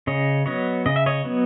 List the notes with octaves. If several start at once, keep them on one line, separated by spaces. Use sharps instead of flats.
C#3 C#5 D#5
F#3 B3 C#5 D#5
C#3 D#5
E5
C#5 D#5
F#3 B3